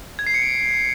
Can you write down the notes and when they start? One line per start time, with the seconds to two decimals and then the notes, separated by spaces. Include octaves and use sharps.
0.19 G#6
0.27 C7
0.34 C#7
0.42 D7